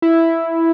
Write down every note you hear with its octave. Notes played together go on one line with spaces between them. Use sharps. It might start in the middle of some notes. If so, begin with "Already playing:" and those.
E4